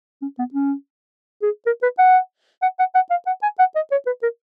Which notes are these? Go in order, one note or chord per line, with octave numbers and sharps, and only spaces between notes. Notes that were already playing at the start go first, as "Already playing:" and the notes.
C#4
B3
C#4
G#4
A#4
B4
F#5
F#5
F#5
F#5
F5
F#5
G#5
F#5
D#5
C#5
B4
A#4